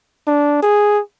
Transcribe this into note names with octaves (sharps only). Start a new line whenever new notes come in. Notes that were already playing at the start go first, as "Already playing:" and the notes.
D4
G#4